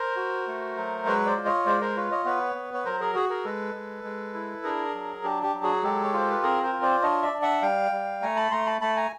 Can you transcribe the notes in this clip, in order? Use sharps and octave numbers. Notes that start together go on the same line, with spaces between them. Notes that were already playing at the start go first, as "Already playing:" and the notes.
Already playing: A#4 C5
F#4
A3
F#3
G#3 B4 C#5
C5 D5
F4
C#5 D#5
G#3 C5 D5
A#4 C5
F4 B4 C#5
C#5 D#5
B3 B4 C#5
B3
C#5
F#3 A#4 C5
G#4 A#4
F#4 G#4
G#4 A#4
G#3 A4 B4
G#3
G#3
E4
D4 G#4 A#4
F#3
D4 G4
G4
F#3
F#4 G#4
G#3 G4 A4
C#5
F4 C5
B4
C4 G#4 A#4
A#4 C5
F4
C5 D5
D4 C#5 D#5
D5 E5
D4
E5 F#5
G3 F5 G5
G3
A3 G#5 A#5
A5 B5
A3 A#5 C6
A5 B5
A3 A5 B5
G#5 A#5